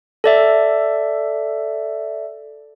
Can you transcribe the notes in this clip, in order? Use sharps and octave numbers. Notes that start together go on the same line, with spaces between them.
A4 D5 E5